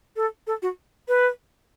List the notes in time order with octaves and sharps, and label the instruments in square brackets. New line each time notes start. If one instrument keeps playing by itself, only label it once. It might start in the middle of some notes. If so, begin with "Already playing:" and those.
[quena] A4
A4
F#4
B4